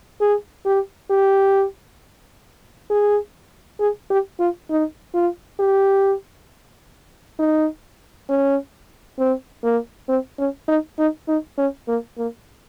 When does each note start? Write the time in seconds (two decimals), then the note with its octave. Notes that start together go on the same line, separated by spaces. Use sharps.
0.21 G#4
0.66 G4
1.10 G4
2.90 G#4
3.80 G#4
4.10 G4
4.39 F4
4.70 D#4
5.14 F4
5.59 G4
7.39 D#4
8.29 C#4
9.19 C4
9.63 A#3
10.09 C4
10.39 C#4
10.68 D#4
10.99 D#4
11.28 D#4
11.58 C#4
11.88 A#3
12.18 A#3